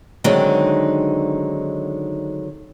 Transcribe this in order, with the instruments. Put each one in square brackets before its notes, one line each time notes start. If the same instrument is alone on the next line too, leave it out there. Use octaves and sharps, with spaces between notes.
[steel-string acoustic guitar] D3 D#3 F#3 G#3 C4 D#4